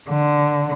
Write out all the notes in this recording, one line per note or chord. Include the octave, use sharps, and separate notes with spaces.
D3